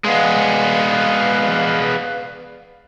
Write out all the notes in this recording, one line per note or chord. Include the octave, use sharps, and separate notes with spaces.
G#3 B3 B4 D5 F5